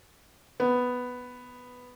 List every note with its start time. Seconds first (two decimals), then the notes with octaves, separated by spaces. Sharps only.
0.60 B3